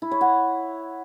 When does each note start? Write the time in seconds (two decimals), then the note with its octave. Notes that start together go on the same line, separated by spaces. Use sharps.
0.02 E4
0.11 C#5
0.21 F#5